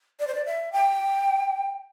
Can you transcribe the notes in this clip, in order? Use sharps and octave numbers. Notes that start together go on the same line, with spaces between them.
D5
C5
D5
E5
G5